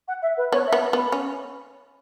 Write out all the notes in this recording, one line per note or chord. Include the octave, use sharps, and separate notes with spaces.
F#5
E5
B4
B3 C#5
E5
B3
B3
B5
C#4